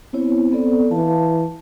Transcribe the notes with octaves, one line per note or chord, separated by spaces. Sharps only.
B3 C4 E4 C#5
B3 A4 D5
E3 F5 A5